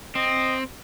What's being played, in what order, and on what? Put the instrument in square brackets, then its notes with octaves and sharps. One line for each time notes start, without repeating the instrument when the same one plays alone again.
[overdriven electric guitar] C4 [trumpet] D#5